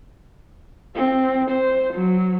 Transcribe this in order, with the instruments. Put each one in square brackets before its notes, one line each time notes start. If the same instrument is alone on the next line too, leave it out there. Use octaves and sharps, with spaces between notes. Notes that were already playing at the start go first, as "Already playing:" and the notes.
[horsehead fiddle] C4
C5
F#3